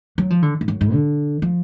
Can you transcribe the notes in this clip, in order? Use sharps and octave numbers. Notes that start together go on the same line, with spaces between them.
F#3
F3
D3
G#2
F#2
G#2
D3
F3